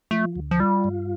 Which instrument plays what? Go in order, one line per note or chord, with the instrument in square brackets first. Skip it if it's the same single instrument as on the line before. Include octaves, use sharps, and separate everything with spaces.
[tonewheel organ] F3 [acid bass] A3
[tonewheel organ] D2
[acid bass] F3
[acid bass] G3 [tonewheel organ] F4
[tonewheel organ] G2